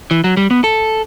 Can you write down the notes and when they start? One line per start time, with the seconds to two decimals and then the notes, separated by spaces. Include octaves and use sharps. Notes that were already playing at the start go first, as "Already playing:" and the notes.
0.11 E3
0.24 F#3
0.37 G3
0.51 B3
0.64 A4